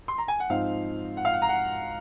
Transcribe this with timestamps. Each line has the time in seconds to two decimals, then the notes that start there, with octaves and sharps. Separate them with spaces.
0.08 C6
0.18 A#5
0.28 G#5
0.40 F#5
0.49 G#2 F3 C4 D#4 F5
1.17 F#5
1.25 F5
1.33 F#5
1.42 A#5
1.49 F#5